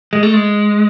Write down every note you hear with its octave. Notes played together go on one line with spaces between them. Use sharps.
G#3
A3
G#3